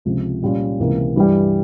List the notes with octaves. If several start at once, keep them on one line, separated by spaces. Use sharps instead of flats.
C#2 C3 F3
A#2 G3 C#4 F4
C#2 C3 E3 A#3
G2 E3 G3